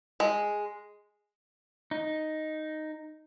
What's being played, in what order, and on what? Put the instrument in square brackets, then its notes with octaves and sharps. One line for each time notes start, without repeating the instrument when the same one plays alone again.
[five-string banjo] G#3
[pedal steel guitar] D#4